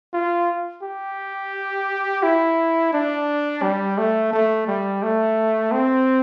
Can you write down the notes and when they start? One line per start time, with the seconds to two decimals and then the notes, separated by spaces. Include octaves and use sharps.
0.14 F4
0.83 G4
2.23 E4
2.93 D4
3.62 G3
3.98 A3
4.33 A3
4.67 G3
5.03 A3
5.72 C4